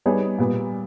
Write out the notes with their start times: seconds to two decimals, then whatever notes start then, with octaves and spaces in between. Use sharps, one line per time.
0.06 G3 B3 D#4 G#4 C#5
0.38 A#2 G3 B3